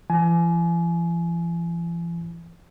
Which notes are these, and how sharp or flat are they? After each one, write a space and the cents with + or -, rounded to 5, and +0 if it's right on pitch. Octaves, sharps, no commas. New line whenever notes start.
E3 +45 G#5 +25